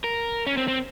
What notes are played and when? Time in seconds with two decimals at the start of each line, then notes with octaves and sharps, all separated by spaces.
0.04 A#4
0.47 C#4
0.57 C4
0.68 C4